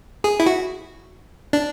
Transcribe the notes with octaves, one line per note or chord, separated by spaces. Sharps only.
G#4
E4
F#4
D4